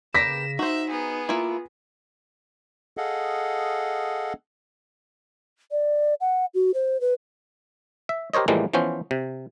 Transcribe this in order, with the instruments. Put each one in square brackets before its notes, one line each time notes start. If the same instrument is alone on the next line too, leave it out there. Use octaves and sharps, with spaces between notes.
[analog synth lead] C#3 [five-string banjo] A#3 G4 B4 [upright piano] A#6 B6 [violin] E7
[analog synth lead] D#4 [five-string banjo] F#4 C5 [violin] E5
[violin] B3 G#4
[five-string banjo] A#3 E4 [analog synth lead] F4
[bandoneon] G#4 A4 D#5 F5 F#5
[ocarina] D5
F#5
F#4
C5
B4
[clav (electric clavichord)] E5
G4 A#4 C5 C#5 D#5
A2 E3 F3 G3 G#3 A#3
E3 F3 B3 C#4 C5
C3